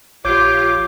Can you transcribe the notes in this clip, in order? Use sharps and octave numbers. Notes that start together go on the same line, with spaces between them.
A#1 F4 G4 C#5 D6 G6 D7